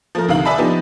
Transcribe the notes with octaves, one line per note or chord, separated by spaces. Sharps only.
F3 A3 A#4
D2 C3 D#3 F5 F#7
B4 D5 E5 G#5 A5 B5
F3 B3 D4 D#4 G4